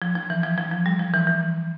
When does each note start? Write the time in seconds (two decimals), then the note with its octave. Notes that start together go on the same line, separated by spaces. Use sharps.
0.02 F3
0.15 F3
0.30 E3
0.43 F3
0.58 F3
0.71 F3
0.86 G3
0.99 F3
1.14 E3
1.27 E3